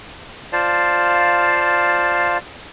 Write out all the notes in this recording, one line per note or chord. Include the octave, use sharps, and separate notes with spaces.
F4 C5 D5 F5 A5